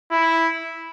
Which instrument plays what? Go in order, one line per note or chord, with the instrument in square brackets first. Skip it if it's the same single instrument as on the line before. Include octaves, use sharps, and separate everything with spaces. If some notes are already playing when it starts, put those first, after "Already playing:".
[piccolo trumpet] E4